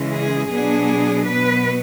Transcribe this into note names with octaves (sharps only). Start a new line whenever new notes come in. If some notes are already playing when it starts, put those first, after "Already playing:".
Already playing: C#3 E3 G#3
G#4
B2 F#3 B3 D4 G#4
B2 F#3 B3 B4